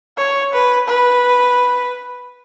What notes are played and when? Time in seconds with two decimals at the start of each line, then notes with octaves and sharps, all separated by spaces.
0.18 C#5
0.53 B4
0.88 B4